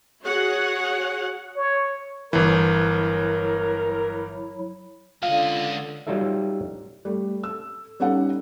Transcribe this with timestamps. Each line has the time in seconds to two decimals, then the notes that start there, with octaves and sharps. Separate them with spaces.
0.22 F#4 G#4 C#5 F#5
1.57 C#5
2.33 G1 E3 F#3 E4 A#4
5.23 C#2 D3 F4 D#5 F5
6.07 F#3 G3 D#4 F4 A4 E5
7.05 G3 A3
7.43 A4 E6
8.00 G3 B3 C#4 D#4 A4 F#5